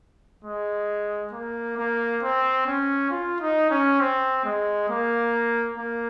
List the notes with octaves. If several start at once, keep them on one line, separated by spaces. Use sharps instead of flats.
G#3
A#3
A#3
C4
C#4
F4
D#4
C#4
C4
G#3
A#3
A#3